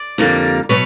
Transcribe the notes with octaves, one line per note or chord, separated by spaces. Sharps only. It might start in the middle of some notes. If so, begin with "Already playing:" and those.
Already playing: D5
F2 D3 G3 A#3
B2 F#3 B4 C#5